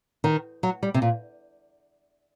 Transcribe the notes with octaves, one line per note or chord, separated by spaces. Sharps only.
D#3
F#3
G3
C3
A#2